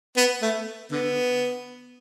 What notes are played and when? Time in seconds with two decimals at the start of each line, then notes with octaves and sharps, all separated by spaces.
0.17 B3
0.42 A3
0.92 D3 B3